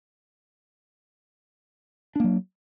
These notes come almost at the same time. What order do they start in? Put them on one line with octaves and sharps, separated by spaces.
D4 A#3 F#3